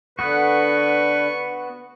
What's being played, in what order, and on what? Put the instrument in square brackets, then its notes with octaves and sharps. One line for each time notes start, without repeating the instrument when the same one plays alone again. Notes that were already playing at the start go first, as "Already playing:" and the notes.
[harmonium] D3 [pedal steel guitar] B3 F#4 [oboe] B4 [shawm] C#6